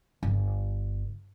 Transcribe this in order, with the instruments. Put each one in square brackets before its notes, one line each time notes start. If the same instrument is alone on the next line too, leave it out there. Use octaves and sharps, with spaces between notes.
[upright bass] G1